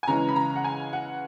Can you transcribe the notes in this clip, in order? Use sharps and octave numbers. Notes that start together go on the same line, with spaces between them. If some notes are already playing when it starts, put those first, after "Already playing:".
G#5
C#3 E3 G#3 C#4 A#5
B5
A#5
F#5
G#5
F#5